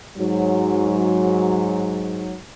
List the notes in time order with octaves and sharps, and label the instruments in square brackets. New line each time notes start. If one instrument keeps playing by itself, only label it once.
[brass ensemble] G#2 F#3